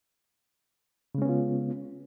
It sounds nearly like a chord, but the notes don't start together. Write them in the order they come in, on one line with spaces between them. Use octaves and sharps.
C#3 G#3 C#4 B3 F4